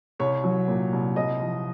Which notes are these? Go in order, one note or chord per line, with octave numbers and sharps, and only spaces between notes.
C2 C#5
F#3
A#2
C2
C2 D#5
F3